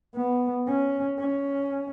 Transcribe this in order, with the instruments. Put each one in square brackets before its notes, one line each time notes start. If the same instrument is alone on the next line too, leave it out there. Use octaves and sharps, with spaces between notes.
[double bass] B3
C#4
C#4